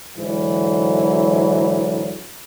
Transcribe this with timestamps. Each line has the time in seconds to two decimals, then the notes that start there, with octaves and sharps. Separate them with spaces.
0.17 G#2 D3 E3 F#3